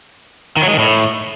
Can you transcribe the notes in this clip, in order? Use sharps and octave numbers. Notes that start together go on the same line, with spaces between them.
D#3
F#3
G#3
D#3
A2